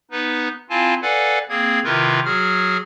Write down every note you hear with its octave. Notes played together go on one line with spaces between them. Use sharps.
B3 D#4 B4
C4 E4 F4 F5 G#5 A5
A4 B4 D5 F5 F#5 G#5
A#3 C4 G#4 G#6
C3 D#3 E4 F4 A#4 B4
F#3 F#4 G#4 F6